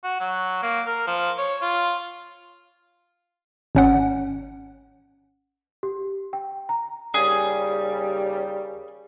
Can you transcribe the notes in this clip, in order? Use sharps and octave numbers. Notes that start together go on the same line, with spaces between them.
F#4
F#3
A#3
A#4
F3
C#5
F4
G#1 C#4 F#5
G4
G5
A#5
D#2 C#3 G3 G#4